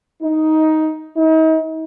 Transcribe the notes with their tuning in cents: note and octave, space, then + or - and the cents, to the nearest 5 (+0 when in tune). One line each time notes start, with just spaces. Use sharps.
D#4 +10
D#4 +40